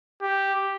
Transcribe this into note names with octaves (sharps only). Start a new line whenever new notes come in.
G4